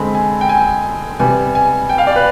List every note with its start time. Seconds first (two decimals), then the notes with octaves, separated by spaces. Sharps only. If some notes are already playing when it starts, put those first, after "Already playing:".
Already playing: D3 G#3 C4 B5
0.15 G#5
0.41 G5
0.49 G#5
1.19 C3 G3 B3 G#5
1.55 G#5
1.89 G5
1.98 F5
2.07 D5
2.16 B4